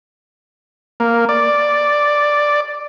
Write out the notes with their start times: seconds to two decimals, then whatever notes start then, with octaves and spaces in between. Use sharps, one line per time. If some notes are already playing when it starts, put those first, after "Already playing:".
1.00 A#3
1.29 D5